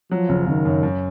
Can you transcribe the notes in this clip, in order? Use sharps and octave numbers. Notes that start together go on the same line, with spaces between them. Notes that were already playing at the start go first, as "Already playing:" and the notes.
F3 F#3
F#1
F#1 D#3
F#2
F#2